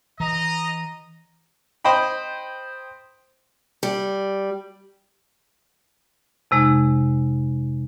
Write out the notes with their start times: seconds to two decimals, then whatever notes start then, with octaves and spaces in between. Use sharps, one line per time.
0.20 E3 D#5 A#5
1.84 C5 D#5 G5 B5
3.83 G3
6.51 F2 C3 G#3 D#4